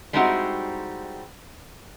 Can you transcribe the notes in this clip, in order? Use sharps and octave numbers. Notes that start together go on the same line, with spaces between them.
G3 G#3 C4 D#4 E4 F#4